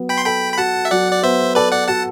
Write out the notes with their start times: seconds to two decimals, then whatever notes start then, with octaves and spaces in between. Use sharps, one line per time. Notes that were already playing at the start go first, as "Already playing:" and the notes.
Already playing: F#3 B3
0.09 G5 B5
0.18 C6
0.25 A4 G5 B5
0.53 B5
0.58 F#4 F#5 A5
0.85 E5
0.91 F#3 D5 F#5
1.12 D5
1.23 B3 C5 E5
1.55 A4 B4 D5
1.72 D5 F#5
1.88 F#4 F#5 A5